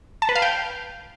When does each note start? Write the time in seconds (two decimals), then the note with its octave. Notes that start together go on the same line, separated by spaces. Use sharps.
0.22 A5
0.29 B4
0.36 F5
0.42 G5